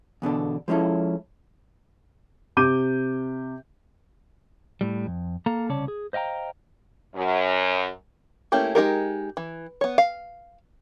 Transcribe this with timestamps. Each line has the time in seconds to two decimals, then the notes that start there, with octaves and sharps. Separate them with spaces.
0.22 E2 B2 D3 D4
0.68 F3 G#3 C#4 E4 A4
2.57 C3 D6 G6 D#7
4.81 A2 G3
5.07 F2
5.46 A#3 A4 F5 A#5
5.69 C2 C#3 C#4 C#5 D5 A5
5.88 G#4
6.13 C5 D#5 F5 G5 A#5
7.15 F#2
8.52 A3 A#3 C#4 E4 G4
8.75 G#3 D#4 G4 A#4
9.37 E3
9.81 B3 C#5
9.98 F5